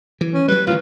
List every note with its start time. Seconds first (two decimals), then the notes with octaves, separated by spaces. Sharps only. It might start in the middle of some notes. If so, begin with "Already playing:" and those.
0.21 E3
0.34 C#4
0.48 F#3 G3 B4
0.67 A1 D3 D#3 F4